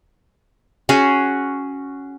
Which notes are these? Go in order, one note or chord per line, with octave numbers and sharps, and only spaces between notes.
C#4 F#4 G#4